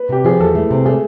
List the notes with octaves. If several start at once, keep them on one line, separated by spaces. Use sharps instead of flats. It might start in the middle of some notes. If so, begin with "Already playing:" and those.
Already playing: B4
C3 G4
F3 G#4
E2 A4
A3
C3
A3 G#4